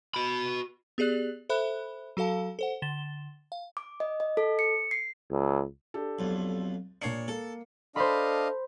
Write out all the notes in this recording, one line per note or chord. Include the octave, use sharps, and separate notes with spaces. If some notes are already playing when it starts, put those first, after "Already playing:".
F#4 B5
B3 G4 G#4 D5 F#6
A4 C5 E5 B5 F#6
F#3 F#4 A4 F5 A5
A4 C5 F#5
D3 A6 E7 G7
F5
D6
D#5
D#5
A4
C#7
C7
C#2
D4 G4 A4
B1 F2
A#2 D4 C#5 C7 C#7
A#3 A4
D4 A4 C5 D#5 F5 B5